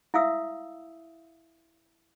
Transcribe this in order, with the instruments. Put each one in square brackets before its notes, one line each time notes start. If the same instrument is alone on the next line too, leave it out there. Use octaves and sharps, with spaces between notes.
[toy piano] E4 E5 F5 D#6 E6